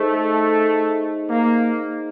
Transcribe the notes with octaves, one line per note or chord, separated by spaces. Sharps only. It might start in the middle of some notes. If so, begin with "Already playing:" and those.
Already playing: A3 D#4 G#4 C5 D#5
A#3